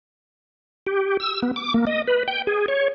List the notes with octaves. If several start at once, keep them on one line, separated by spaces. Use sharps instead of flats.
G4
E6
B3
D6
A#3
D#5
B4
G5
G#4
C#5